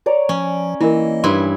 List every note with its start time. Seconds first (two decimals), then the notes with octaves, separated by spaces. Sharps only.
0.06 C#5 D5 A#5
0.29 F3 C#4
0.81 E3 A#3 E4 A#4 D#5
1.24 G2 E4 G#5 C6